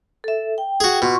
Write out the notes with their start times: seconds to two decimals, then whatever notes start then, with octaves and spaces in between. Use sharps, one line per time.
0.24 A4 E5
0.58 G5
0.80 F#4 G#4
1.02 B2 F4 C6 C#6